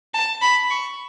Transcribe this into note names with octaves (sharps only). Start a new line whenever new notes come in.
A5
B5
C#6